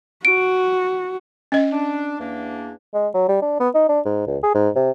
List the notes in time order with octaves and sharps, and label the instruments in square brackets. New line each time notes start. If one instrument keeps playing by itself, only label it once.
[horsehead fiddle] F#4 [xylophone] D7
[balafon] C#4 D#5
[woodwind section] D4
E2 A#3 D4
[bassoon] G#3
F#3
G3
D4
B3
D#4
D4
G#2
C#2
G#4
G#2
C3